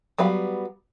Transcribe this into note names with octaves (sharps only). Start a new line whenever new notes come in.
F#3 G3 B3 F5 B5